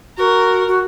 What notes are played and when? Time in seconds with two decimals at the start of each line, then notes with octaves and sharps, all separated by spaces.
0.17 F#4 A#4
0.68 F#4